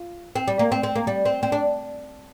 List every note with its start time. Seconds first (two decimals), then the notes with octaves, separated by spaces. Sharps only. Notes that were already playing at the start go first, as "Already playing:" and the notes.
Already playing: F4
0.35 C4
0.48 G3
0.59 A#3
0.72 C4
0.83 C4
0.96 A#3
1.07 G3
1.26 C4
1.43 C4
1.52 D4